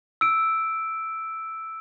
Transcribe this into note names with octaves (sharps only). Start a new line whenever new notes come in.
E6 D7